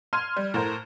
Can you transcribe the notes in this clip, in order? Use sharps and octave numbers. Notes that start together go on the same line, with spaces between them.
C6 F6 G#6 D#7
G3
A2 A#4 C5